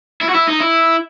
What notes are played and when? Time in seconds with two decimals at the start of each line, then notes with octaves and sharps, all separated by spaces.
0.21 E4
0.29 F#4
0.35 E4
0.48 D#4
0.61 E4